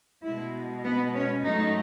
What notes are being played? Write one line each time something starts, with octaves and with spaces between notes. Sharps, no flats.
B2 G#3 E4
B3
C#4
G#2 F#3 A3 D#4